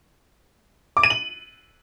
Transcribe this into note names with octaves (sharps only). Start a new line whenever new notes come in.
D6
D#7
F#7